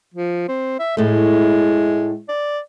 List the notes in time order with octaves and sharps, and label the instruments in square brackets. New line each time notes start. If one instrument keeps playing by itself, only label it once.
[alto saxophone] F3
C4
E5
[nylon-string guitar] A2 A3 [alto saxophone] G#3
[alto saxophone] D5